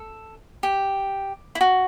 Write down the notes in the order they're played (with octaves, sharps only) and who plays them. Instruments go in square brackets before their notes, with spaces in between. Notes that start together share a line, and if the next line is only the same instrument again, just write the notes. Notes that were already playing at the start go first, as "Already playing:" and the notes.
Already playing: [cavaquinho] A4
G4
E4
F#4